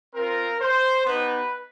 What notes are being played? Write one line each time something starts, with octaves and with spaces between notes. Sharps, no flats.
C4 F4 A#4
C5
B3 D#4 G4 B4